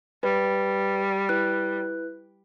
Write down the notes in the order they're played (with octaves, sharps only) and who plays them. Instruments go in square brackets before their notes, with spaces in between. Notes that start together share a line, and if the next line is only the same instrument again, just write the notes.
[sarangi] G3 [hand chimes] B4
[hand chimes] E4 B4 F#6